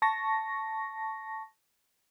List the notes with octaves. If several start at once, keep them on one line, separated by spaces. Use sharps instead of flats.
A5 C#6 A#6